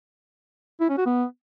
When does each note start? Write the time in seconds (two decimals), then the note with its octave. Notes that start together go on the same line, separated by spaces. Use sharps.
0.81 E4
0.89 C#4
0.98 F#4
1.06 B3